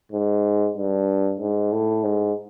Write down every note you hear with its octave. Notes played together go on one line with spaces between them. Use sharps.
G#2
G2
G#2
A2
G#2